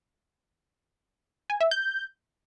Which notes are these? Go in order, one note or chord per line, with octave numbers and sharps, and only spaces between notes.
G#5
E5
G6